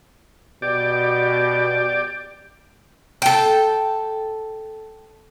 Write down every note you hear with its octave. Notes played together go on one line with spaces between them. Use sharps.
B2 G4 D5
A4 G5